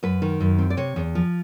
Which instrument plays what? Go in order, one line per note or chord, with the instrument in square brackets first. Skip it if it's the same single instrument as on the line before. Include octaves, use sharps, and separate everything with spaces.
[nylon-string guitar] F#2 B4
D#3
F#2
C4
D5
C3 C#5
E2
F3